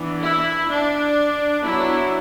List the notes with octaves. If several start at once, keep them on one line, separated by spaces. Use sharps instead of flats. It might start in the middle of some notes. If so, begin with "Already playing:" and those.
Already playing: E3 B3 D4
E4
D4
F#3 B3 D4 E4